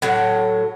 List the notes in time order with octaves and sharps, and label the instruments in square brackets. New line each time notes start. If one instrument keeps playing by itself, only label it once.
[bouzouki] A2 F#3